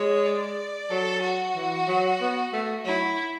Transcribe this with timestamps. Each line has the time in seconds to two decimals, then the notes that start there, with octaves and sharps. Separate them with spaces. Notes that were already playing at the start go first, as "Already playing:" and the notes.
Already playing: G#3 C#5
0.26 D5
0.90 F#3 A4
1.23 F#4
1.55 E3
1.88 F#3
2.20 B3
2.53 A3
2.85 F#3 E4